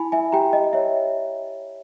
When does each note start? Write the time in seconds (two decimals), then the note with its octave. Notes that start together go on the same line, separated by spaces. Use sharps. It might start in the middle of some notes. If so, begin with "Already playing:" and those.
Already playing: E4 G#5 B5
0.12 E5 G#5
0.32 G4 G5 A#5
0.53 D#5
0.73 C#5 E5